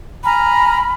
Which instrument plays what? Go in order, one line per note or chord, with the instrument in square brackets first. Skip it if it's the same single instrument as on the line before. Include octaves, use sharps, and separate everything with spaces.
[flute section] G#5 A#5 F6 [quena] B5